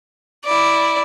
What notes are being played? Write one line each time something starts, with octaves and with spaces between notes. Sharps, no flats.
E4 D5